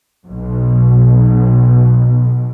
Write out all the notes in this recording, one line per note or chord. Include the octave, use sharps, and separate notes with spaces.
B1 B2